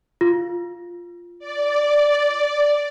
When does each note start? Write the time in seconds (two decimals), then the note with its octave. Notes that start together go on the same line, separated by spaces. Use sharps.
0.21 F4
1.39 D5